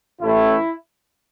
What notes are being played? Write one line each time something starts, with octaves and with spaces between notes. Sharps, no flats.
A1 A2 A3 E4